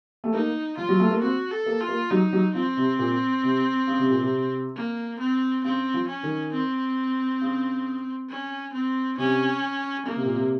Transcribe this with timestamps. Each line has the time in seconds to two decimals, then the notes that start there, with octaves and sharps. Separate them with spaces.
0.24 A3
0.33 A#3 D#4
0.77 F3 F4
0.89 F#3
1.00 A3
1.11 A#3
1.22 C4 F#4
1.51 A4
1.66 A#3
1.81 F4
1.88 A#3
2.11 F#3 D#4
2.33 F#3
2.55 F3 C4
2.77 C3
2.99 A#2
3.43 C3
3.87 C#3
3.99 C3
4.10 A#2
4.21 C3
4.76 A#3
5.20 C4
5.64 C#3 C4
5.94 F3
6.08 C#4
6.23 D#3
6.53 C4
7.41 C#3
8.30 C#4
8.74 C4
9.18 C3 C#4
10.06 C#3 A#3
10.16 C3
10.25 A#2
10.35 C3